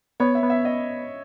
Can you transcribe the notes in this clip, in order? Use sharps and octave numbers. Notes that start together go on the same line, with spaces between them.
B3 C#5
E5
B3
E5
D#5